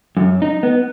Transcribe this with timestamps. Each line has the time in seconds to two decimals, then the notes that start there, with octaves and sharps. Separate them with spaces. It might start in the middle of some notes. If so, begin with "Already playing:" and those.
0.17 F#2
0.42 D#4
0.63 B3